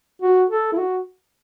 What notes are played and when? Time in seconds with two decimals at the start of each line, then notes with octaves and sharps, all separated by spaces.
0.22 F#4
0.49 A4
0.72 E4
0.77 F#4